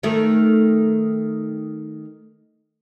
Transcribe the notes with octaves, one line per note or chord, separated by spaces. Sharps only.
D#3 A3